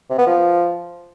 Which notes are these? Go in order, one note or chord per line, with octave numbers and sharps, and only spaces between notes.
C3
B3
F3